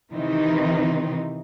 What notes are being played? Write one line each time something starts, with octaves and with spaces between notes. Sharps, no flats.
C3 D#3 E3 C4 D#4